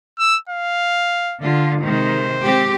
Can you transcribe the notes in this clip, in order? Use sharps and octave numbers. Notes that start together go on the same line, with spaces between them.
E6
F5
D3 F4
C3 D#3 G#3 C5
G#3 C4 G4